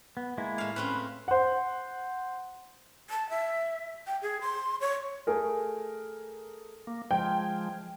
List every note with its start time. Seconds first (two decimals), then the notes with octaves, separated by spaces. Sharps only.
0.17 B3
0.38 G#3 A#3 E4
0.58 A2 F5
0.76 A2 C4 C#4 B4
1.28 C5 F#5
3.10 A5
3.30 E5
4.07 G5
4.22 G#4
4.41 C6
4.81 C#5
5.27 A3 G#4 A#4
6.87 A#3
7.11 F3 G#3 G5